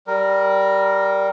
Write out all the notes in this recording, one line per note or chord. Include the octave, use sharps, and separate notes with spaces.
G3 A#4